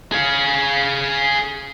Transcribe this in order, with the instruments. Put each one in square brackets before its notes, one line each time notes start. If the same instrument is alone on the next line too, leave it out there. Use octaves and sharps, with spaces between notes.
[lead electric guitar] G#4 F5